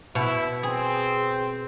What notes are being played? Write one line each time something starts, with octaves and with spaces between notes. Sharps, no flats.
B2 E4
C4 G#4